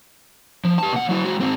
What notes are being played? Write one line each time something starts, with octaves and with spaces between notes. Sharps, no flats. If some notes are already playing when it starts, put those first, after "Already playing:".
F3
G4 A5
B2 F#5
F#3 E4
G#3 F#4
G#2 C4